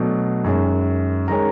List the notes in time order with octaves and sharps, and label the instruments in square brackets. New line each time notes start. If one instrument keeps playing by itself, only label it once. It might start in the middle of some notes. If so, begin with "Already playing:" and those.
Already playing: [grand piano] B2 F#3 A3 D4
F#2 D#3 G#3 C#4
D#3 G#3 C#4 A#4 A#5